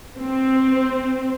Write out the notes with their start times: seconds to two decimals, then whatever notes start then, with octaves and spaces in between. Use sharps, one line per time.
0.18 C4